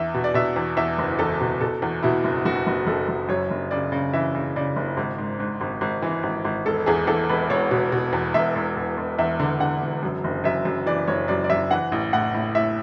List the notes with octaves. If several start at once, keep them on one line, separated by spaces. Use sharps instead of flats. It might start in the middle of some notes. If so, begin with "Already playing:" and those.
Already playing: E2 E5
B2
D5
B2 E5
E2
E2 E5
F#1
E2 A4
B2
B2 A4
E2
B2 E4
F#1
F#1 F#4
F#1
F#1 A4
F#1
F#2 C#5
F#1
C#3 D5
C#3
E3 E5
C#3
C#3 D5
F#1
G#1
G#2
G#2
G#1
G#1
E3
G#1
G#1
E1 A4
E2 G#4
E2 A4
E1 B4
E1 C#5
B2
B2
E2
E1 E5
E1
E1
E1
E2 E5
D3
D3 F#5
E1
F#2
F#1
F#2 E5
F#2
E3 D5
F#1 C#5
F#2 D5
D5
F#2 E5
E3 F#5
A1
A2 F#5
A2
A2 E5